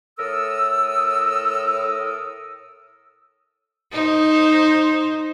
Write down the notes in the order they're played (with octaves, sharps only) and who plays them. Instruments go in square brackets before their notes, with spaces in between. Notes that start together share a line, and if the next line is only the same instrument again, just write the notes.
[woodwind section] A2 A4 A#4 D#6 E6
[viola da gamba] D#4 C5